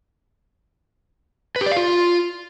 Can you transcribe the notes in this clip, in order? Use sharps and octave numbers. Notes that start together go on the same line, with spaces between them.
B4
G4
D5
F5
F4